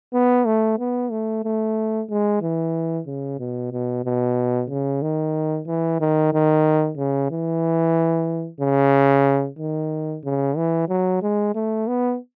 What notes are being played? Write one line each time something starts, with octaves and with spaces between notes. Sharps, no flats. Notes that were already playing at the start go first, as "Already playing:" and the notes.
B3
A3
B3
A3
A3
G#3
E3
C#3
B2
B2
B2
C#3
D#3
E3
D#3
D#3
C#3
E3
C#3
D#3
C#3
E3
F#3
G#3
A3
B3